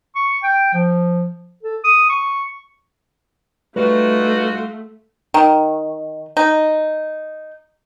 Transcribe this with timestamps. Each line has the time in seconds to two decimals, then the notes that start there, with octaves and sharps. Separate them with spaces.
0.16 C#6
0.43 G5
0.74 F3
1.63 A4
1.84 D#6
2.09 C#6
3.76 G3 A3 D#4 F4 F#4 B4
5.34 D#3
6.37 D#4